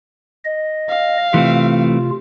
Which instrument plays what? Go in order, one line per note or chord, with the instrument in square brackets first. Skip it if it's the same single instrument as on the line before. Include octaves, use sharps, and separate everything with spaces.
[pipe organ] D#5
[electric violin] F5
[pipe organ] C3 F4 [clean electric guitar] E3 A3 C4